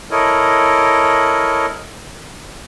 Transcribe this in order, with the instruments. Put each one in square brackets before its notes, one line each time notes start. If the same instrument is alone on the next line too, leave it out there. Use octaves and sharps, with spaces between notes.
[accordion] E4 A4 A#4 C#5 D#5